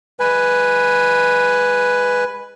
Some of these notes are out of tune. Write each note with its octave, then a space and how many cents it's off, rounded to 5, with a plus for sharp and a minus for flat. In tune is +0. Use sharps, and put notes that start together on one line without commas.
G#3 -25 B4 +0 G#5 +0